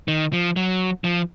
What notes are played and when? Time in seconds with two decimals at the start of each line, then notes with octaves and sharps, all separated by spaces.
0.08 D#3
0.33 F3
0.56 F#3
1.04 F3